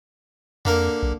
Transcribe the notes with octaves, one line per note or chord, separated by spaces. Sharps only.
F2 D3 A#3 A#4
B1